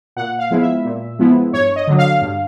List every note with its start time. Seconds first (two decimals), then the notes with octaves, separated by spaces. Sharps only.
0.16 A#2 F#5
0.39 F5
0.51 F3 G#3 B3 E4
0.62 E5
0.85 A#2
1.19 F3 G#3 B3 E4
1.53 G2 C#5
1.76 D#5
1.87 D3 F#3
1.98 F5
2.22 G2